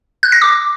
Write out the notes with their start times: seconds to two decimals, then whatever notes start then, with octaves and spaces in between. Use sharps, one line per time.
0.23 F#6
0.32 A#6
0.41 D6